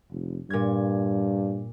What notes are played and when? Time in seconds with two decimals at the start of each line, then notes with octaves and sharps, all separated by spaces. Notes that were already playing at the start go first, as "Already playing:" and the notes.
0.10 F1
0.50 G2 A#2 G#6